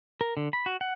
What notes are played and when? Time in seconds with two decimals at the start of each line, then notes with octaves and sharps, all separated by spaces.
0.21 A#4
0.37 D3
0.53 B5
0.66 F#4
0.81 F#5